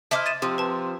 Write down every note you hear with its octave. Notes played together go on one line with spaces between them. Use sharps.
E4 C5 D#5 A5 D6 F6
A6 D#7 E7
C3 F3
B4 A5